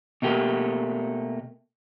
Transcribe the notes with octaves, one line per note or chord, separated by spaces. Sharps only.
B2 A3 A#3 G4